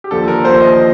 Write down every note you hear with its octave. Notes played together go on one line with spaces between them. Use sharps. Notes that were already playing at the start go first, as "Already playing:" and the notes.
G4
D#2 D3 F3 A4
A#4
D#2 D3 F3 C5
D#5